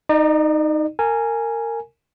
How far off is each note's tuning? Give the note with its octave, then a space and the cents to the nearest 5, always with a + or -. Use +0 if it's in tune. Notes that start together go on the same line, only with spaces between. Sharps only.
D#4 +0 D5 +45
A#4 -25 G#5 +0